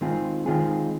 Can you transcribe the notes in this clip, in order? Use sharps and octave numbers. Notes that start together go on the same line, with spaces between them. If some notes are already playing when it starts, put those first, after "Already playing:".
D#3 G#3 C4 F4 G#4
D#3 G#3 C4 F4 G#4